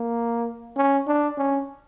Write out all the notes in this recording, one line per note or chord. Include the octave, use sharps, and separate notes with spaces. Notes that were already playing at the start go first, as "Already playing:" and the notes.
Already playing: A#3
C#4
D4
C#4